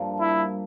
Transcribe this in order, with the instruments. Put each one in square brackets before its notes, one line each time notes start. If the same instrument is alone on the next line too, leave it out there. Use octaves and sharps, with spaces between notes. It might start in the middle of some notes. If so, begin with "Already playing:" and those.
Already playing: [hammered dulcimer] G2 F3 A#3 D4
[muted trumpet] E4